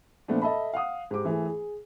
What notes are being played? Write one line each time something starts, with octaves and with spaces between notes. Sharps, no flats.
A#2 F3 A3 B3 D4
A4 D#5 E5 A5 B5
F5 F#5 D#6
G#2 G4 D6
E3 A3 G#4
G#4